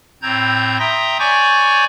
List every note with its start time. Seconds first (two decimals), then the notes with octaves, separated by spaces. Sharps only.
0.22 A2 C4 A#5 G6 G#6
0.79 E5 G5 A#5 C6 D#6 A#6
1.19 C#5 D5 G#5 C#6 D6 G6